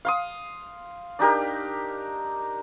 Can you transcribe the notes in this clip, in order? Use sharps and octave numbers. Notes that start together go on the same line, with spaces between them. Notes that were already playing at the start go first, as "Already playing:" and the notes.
F5 C6 D#6
D4 D#4 G4 A#4